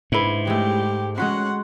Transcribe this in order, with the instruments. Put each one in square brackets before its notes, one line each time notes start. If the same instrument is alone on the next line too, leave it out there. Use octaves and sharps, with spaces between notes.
[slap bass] G#2 [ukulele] D4 E4 B4
[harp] G#3 A3 [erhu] G4
[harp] G#3 F#4 C6 [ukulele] C#4 [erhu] F#5